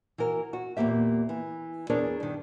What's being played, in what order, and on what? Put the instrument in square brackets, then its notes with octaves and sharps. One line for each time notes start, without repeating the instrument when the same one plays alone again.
[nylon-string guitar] E3 F#4 A#4
F#4
E2 A#2 A#3 G4 E5
E3
E2 D4 G#4 A#4 C#5 D5
G2 D#3